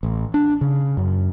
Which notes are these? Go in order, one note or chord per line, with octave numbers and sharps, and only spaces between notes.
A1
D4
C#3
F#2